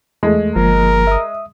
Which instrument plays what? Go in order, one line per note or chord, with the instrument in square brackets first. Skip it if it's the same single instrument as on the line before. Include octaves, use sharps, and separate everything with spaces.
[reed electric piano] E2 A3 [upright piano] G#3
[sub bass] G1 [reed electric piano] F3 A#3 [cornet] A#4
[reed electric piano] E5 D#6